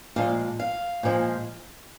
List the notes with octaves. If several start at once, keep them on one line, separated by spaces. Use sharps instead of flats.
A#2 F3 G#3 F5
F5
A#2 F3 G#3